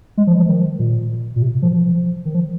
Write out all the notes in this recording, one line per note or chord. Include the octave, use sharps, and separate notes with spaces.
G#3
F3
F3
D#3
A#2
A#2
C3
F3
F3
D#3
F3